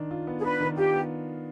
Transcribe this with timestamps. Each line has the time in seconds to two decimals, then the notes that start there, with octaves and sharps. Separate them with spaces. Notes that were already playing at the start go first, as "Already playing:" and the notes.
Already playing: D#3 D4
0.11 F4
0.27 B3
0.39 G#4
0.44 D4 B4
0.60 D#3
0.77 F4 G4
0.93 B3